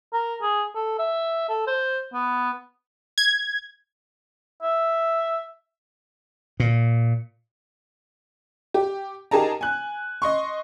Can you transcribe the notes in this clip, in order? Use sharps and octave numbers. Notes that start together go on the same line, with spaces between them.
A#4
G#4
A4
E5
A4
C5
B3
G#6
E5
A#2
G4
D#4 G4 G#4 A#4 A5 A#5
G#5 F#6
D#5 C6 C#6